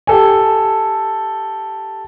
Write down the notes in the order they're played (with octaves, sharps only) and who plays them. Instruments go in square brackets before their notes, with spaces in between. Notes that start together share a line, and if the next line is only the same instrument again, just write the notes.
[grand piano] G4 A4 G#5